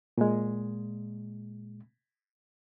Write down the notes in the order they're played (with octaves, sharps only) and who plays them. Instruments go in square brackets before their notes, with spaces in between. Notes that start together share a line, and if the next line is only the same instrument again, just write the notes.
[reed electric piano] A#2 G#3